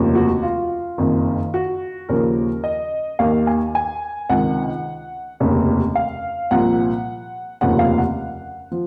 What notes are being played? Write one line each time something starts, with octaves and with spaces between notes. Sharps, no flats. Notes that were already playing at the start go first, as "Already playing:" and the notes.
Already playing: F1 D#2 C#3 F3
F#4
F4
F#1 F2 D#3
F#4
D#2 C#3 F3 A#4
D#5
D#2 D#3 F5
G#5
G#5
C#2 C3 D#3 F#5
F1 D#2 C#3
F5
C2 A#2 F3 F#5
F1 D#2 C#3 F3 F#5
F5
F#5
F3